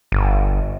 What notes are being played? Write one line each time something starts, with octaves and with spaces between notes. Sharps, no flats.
G1